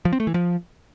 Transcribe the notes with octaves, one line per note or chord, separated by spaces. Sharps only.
F3
C4
A3
E3
F3